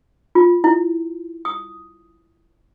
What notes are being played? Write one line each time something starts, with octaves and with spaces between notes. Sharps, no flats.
F4
E4
D#6